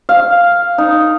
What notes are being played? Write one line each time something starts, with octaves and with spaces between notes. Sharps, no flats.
F5
D#4